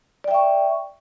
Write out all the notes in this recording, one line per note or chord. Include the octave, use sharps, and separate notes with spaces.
D5 E5 G5 C#6